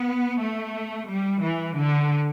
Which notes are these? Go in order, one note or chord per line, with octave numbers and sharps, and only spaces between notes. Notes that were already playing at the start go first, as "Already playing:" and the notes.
Already playing: B3
A3
G3
E3
D3